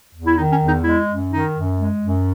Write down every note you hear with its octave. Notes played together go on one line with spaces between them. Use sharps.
E2
E4
D#3 D#4
C#4
E2
D#4
G#3 E4
F#2
D#3 D#4
F#2
G#3
F#2